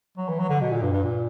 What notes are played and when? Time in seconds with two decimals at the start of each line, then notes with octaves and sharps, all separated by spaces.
0.18 F#3
0.28 E3
0.39 F#3
0.49 D3
0.61 B2
0.71 A#2
0.82 G2
0.93 G2
1.03 A#2